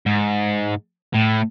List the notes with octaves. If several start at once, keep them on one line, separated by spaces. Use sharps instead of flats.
G#2
A2